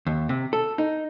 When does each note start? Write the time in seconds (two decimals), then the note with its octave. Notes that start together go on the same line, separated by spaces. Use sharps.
0.06 D#2
0.29 C3
0.53 A4
0.78 D#4